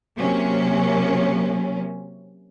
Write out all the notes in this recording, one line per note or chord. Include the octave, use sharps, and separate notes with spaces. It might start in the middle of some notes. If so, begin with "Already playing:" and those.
C3 F#3 A#3 C#4